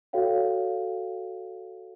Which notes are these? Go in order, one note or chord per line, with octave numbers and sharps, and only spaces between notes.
F#4 A4 C#5 F5 G5